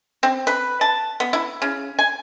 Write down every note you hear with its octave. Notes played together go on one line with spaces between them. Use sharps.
C4
B4
A5
B3
E4
C#3
G#5